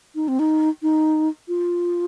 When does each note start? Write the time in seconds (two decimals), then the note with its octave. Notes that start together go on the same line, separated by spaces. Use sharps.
0.15 D#4
0.28 C4
0.39 D#4
0.83 D#4
1.48 F4